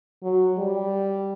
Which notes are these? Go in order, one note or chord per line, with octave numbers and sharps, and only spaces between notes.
F#3
G3